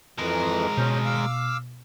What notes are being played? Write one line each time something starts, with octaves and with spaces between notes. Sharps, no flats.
F2 E3 G#3 A#4
B2 C#4 C5
F5 D6 E6